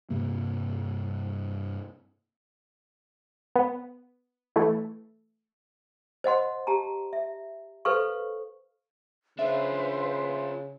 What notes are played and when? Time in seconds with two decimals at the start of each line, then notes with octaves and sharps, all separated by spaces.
0.10 G2 C3 A#3
3.56 B3
4.56 E3 A3
6.24 C5 D#5 F#5 C6
6.67 G4 A5 A#5
7.13 E5
7.85 A4 B4 C5 F5 C#6
9.39 C#3 D4 F4 B4 C5 E5 C6